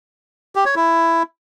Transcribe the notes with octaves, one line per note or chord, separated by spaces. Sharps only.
G4
C#5
E4